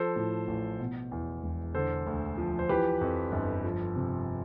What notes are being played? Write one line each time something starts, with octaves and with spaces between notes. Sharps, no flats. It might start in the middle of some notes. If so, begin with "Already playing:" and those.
Already playing: F3 A4 C5
A2
A1
B2
E2
E1
D3 A4 C5
D2
F3
C5
E3 G4 B4
F2
G1
F3
C3